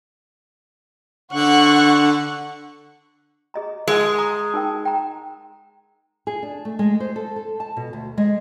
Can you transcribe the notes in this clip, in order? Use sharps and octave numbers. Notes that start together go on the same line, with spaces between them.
D3 F#5 C#6 F#6
G#4 D#5 A#5
G#3 A#4 F#5 G#5
A#5 D#6
D#4 A#4 G5
G5 A#5
G#4
D4
A3
G#3
C5
A4
A4
A5
B2
D2
G#3